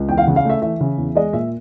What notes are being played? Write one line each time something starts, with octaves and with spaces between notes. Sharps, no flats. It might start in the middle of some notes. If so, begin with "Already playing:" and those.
Already playing: C#2
E2 G5
F5
F#5
C#3
F5
A3 E5
E3 E5
C#3
E2
G#3 D#5
A#2 E5